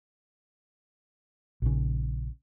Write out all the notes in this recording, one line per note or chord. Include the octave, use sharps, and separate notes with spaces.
A#1 C#3